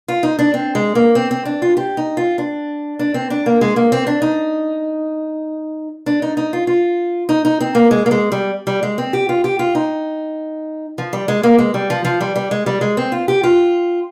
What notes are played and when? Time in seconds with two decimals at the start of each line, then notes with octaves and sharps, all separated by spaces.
0.08 F4
0.23 D#4
0.39 D4
0.54 C4
0.75 G#3
0.95 A#3
1.15 C4
1.31 C4
1.45 D4
1.62 F4
1.77 G4
1.97 D#4
2.17 F4
2.38 D4
2.99 D4
3.14 C4
3.30 D4
3.46 A#3
3.61 G#3
3.76 A#3
3.92 C4
4.07 D4
4.22 D#4
6.06 D4
6.22 D#4
6.37 D#4
6.53 F4
6.67 F4
7.29 D#4
7.45 D#4
7.60 C4
7.75 A#3
7.91 G#3
8.06 A#3
8.11 G#3
8.32 G3
8.67 G3
8.83 G#3
8.98 C4
9.13 G4
9.29 F4
9.44 G4
9.59 F4
9.75 D#4
10.98 F3
11.13 G3
11.28 G#3
11.43 A#3
11.58 G#3
11.74 G3
11.90 F3
12.05 F3
12.21 G3
12.36 G3
12.51 G#3
12.66 G3
12.81 G#3
12.97 C4
13.12 F4
13.28 G4
13.43 F4